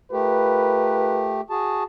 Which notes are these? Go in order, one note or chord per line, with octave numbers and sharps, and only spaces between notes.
A3 F4 G4 A#4 B4
F#4 G#4 A5